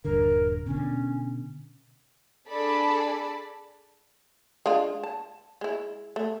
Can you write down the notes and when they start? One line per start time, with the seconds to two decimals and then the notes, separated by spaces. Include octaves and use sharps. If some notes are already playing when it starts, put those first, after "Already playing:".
0.05 D#1 G2 D3 A#4
0.66 B2 D3 C#4
2.48 D4 G#4 A4 D5 A5 B5
4.66 G#3 D4 F4
5.03 A5
5.61 G#3 E4
6.16 A3